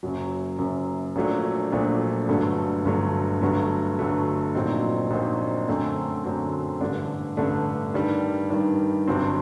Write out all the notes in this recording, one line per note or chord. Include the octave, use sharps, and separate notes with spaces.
F#1 F#2 F#3
F#1 F#2 F#3
A#1 A#2 F#3 A3 D4
A#1 A#2 F#3 A3 D4
G1 G2 D3 F#3 A3
G1 G2 D3 F#3 A3
G1 G2 F#3 A3
G1 G2 F#3 A3
A#1 A#2 F#3 C4 D#4
A#1 A#2 F#3 C4 D#4
F#2 D3 F#3 A3 C4
F#2 D3 F#3 A3 C4
A1 G2 D3 A3 D4
A1 G2 D3 A3 D4
G2 D#3 G3
G2 D#3 G3
G1 G2 F#3 C4